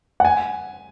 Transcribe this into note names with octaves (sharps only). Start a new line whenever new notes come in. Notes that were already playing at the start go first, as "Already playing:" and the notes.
F#5
G#5